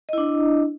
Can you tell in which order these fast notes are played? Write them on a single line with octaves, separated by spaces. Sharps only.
D#5 E4 D4